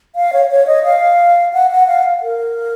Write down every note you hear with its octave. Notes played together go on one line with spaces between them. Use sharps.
F5
C#5
C#5
D#5
F5
F#5
F#5
F5
A#4